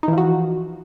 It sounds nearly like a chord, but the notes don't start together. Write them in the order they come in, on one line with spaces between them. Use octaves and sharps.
D#4 E3 F3 F#4